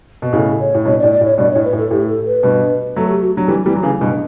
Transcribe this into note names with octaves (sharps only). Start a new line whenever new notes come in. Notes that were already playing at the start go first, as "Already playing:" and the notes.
B2
A2 C#3 A4
C#5
A2
G2 B2 C#5
D5
A2
D5
A2
C#5
G2 B2 D5
C#5
A2
B4
A2
A4
A2 G4
A4
B4
G2 B2
F#3 A3 A4
G4
F#4
F#3 D4
E3 G3
E3 G3
F#3
C#3 E3
G2 B2